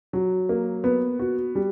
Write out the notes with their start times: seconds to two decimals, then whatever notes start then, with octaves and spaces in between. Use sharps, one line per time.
0.13 F#3
0.49 A#3
0.84 B3
1.19 F#4
1.55 G3